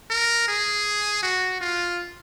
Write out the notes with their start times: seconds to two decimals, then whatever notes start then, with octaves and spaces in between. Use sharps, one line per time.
0.10 A#4
0.48 G#4
1.23 F#4
1.61 F4